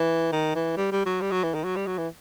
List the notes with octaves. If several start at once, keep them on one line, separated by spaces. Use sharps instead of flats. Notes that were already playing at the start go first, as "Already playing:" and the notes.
Already playing: E3
D#3
E3
G3
G3
F#3
G3
F#3
E3
D#3
F#3
G3
F#3
E3